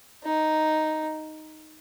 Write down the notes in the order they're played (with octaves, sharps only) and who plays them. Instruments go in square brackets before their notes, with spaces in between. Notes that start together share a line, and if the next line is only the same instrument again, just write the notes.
[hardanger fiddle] D#4